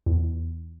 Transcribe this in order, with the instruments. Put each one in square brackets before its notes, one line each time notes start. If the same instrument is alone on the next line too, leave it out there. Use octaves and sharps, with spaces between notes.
[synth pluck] E2